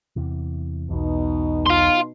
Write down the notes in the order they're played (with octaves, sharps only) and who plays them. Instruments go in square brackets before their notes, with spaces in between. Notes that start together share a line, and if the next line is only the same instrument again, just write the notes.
[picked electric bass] E2 C3 E3
[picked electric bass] B1 E2 [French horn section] B2 D#4
[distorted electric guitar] F5 C6